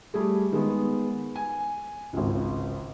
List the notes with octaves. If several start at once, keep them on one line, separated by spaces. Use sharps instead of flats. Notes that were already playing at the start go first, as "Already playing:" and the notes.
G3 A3 G#4
D#3 G#3 B3
G#5
G#1 C#2